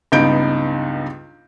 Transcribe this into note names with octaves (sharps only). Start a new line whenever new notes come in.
C#2 G2 B3 D#4 G6 D7